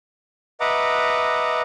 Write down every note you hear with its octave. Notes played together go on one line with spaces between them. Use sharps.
B4 D#5 E5 F#5 A#5 D6